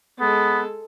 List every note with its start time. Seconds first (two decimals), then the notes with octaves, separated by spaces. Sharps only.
0.19 G#3 B3 A4